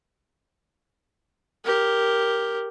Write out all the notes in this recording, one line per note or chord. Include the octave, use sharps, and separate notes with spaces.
G4 A#4